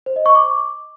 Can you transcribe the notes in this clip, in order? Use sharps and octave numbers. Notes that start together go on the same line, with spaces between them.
C5
D#5
C#6
D6